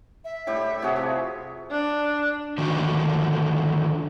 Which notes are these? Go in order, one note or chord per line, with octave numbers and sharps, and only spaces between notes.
E5
A2 G3 G4
C3 F#4 G#4
F3
D4
D3 D#3 F3 F#4